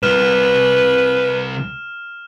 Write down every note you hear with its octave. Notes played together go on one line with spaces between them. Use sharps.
C2 G3 B4 F6 E7